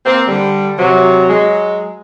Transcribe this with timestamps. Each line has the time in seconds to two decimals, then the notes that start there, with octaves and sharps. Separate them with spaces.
0.05 A#3 C4
0.28 D3 G3
0.78 C3 F#3
1.29 F#3 G#3